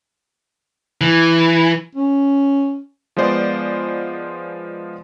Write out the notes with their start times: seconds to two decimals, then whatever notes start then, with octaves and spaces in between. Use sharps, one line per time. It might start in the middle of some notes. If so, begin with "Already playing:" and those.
1.01 E3
1.95 C#4
3.17 F3 G#3 B3 C5 D5